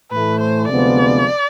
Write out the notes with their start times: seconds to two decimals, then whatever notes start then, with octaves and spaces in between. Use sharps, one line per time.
0.11 A2 E3 A3 B4
0.41 C5
0.69 D2 C3 F3 G#3 B3 D5